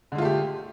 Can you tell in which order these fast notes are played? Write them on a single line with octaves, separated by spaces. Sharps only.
D3 G#3 F4 A3 G4